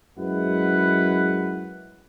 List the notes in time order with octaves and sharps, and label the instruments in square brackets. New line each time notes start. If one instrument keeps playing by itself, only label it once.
[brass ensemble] F#2 G#3 E4 B4 F#5